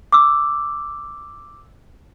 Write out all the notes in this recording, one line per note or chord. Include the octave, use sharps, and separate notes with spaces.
D6 E6